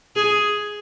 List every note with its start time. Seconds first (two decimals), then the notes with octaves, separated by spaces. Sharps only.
0.16 G#4